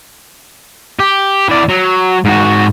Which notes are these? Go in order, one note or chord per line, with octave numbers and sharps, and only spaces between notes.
G4
E3 D5
F#3
G#2 F#4